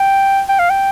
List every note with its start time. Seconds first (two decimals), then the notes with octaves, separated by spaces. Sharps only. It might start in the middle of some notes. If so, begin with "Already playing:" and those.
Already playing: G5
0.49 G5
0.59 F5
0.70 G5